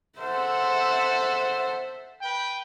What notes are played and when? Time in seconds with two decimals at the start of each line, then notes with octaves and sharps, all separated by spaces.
0.19 A4 C5 E5 F#5
2.22 B4 G5